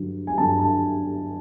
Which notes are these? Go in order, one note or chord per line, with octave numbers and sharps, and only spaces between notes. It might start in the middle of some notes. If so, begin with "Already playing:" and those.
Already playing: G2 D3 F#3
G#5
G2 D3 F#3 A5
A5